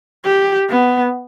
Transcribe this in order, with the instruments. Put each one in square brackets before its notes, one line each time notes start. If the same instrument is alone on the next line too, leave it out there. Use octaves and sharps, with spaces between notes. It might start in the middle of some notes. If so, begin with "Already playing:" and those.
[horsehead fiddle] G4
B3